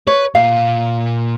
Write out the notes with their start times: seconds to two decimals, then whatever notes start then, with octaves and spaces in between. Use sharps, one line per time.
0.07 B4 C#5
0.35 A#2 F5